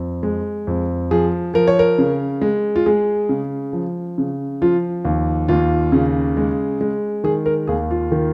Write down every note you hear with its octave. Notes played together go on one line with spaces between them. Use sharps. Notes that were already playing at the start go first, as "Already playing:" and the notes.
Already playing: F2
G#3
F2
F3 G#4
F3 A#4
C#5
A#4
C#3
G#3
F4
G#3 G#4
C#3
F3
C#3
F3 F4
D#2
D#2 F4
C#3
G#3
G#3
D#3 G#4
A#4
D#2 G#4
F4
D#3